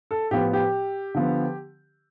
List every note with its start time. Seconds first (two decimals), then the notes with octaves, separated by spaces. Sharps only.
0.11 A4
0.31 A2 F3 B3 G4
0.53 G4
1.15 D3 F3 B3